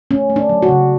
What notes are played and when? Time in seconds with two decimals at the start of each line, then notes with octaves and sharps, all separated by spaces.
0.11 A3 C#4
0.30 A3
0.36 D4
0.49 F#3
0.62 F#4
0.69 C#3